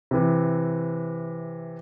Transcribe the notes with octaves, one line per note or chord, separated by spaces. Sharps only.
C3 E3